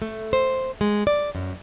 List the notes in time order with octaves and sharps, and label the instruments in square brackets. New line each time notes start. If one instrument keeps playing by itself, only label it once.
[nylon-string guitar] A3
C5
G#3
D5
F#2